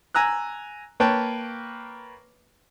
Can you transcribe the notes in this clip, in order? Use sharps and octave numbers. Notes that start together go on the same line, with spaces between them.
G#5 A#5 E6 F#6
A#3 B4 C#5 G5 A5